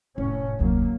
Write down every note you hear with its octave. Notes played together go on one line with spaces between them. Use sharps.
F1 A2 C#4
F1 D2 F#3 A#3